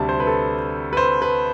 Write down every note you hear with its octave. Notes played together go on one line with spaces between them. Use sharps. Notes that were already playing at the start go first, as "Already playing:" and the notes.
Already playing: D2 C3 G3 A5
C5
B4
A4
B4
C5
B4